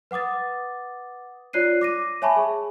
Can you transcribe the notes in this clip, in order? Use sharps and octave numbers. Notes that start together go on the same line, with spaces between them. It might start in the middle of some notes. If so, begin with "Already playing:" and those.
B4 F#5 D6 D#6 A6
F4 C#5 D5 F#6 C7 D#7
D6 A#6 D#7
C#5 E5 G#5 A5 B5 C#6
G#4